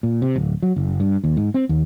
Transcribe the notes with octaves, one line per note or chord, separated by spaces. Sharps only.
A#2
C3
D1
F#3
F#1
G2
D#2
G#2
C4
D#2